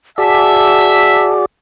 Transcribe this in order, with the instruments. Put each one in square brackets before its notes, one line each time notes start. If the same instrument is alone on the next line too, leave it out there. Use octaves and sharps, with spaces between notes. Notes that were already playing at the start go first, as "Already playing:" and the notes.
[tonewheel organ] F#4 G#4 D5 [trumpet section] E5 [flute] A5